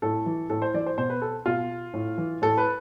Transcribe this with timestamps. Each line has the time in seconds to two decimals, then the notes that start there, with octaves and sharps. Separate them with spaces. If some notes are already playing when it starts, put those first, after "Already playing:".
0.02 A2 A4
0.26 E3
0.50 A2 A4
0.62 C5
0.74 E3 D5
0.86 C5
0.98 B2 C5
1.10 B4
1.22 A4
1.46 B2 F4
1.94 A2
2.18 E3
2.42 A2 A4
2.58 B4